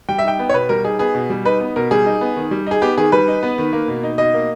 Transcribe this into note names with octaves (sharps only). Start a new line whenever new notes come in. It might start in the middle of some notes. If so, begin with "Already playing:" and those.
G3 G5
E5
D#4 G5
B3
C#5
B2 B4
G3 A#4
D#4 G#4
B3 G#4
B2
G3
D#4 B4
B3
B2 A#4
G3 G#4
D#4
B3
D#3
G3
D#4 G#4
B3 G4
D#3 G#4
G3 B4
D#4
B3
D#3
A#3
B2
D#4
B2 D#5
A#3